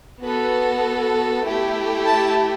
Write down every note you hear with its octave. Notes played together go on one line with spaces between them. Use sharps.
B3 F#4 A4 B4
A3 E4 G4
A5